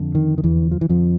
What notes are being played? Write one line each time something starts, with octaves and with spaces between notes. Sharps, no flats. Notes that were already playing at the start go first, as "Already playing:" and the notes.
Already playing: F2 D3
D#3
D#3
E2 E3
F3
E3
F2 F3